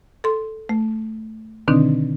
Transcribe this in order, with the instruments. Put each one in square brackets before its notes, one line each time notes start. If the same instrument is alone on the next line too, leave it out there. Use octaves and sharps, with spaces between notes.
[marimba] A4 C6
A3
B2 D3 D#3 C4 D4 D#4